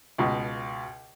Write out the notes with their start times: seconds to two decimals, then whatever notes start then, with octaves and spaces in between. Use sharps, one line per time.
0.18 C#2 B2